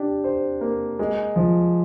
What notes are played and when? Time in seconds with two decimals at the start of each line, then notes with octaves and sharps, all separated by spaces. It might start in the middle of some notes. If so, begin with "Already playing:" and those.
Already playing: D4 G4
0.24 C5
0.61 A#3
0.99 G#3
1.36 F3